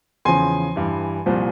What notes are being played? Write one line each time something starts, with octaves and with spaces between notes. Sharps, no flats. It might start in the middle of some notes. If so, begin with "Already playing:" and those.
E2 C#3 F3 G#5 C6
G2 E3
C2 A#2 F3